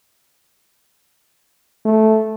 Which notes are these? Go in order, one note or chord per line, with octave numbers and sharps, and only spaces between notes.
A3